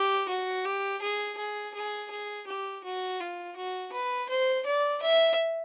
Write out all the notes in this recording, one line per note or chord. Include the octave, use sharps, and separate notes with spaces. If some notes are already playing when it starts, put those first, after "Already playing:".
Already playing: G4
F#4
G4
G#4
G#4
G#4
G#4
G4
F#4
F4
F#4
B4
C5
D5
E5